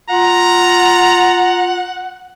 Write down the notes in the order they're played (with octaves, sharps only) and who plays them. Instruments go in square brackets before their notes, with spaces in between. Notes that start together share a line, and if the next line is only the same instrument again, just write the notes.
[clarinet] F4 [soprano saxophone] F#5 [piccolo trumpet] A#5